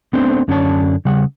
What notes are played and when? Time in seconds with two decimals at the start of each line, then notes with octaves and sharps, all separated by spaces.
0.13 A3 B3 C4 D4 C5
0.48 F#2 D3 C#4 D4 C#5 A5
1.05 C#3 G3 F#5